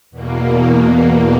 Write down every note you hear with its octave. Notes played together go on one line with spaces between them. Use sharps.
E2 B2 A#3